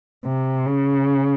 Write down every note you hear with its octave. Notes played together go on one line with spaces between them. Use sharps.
C3
C#3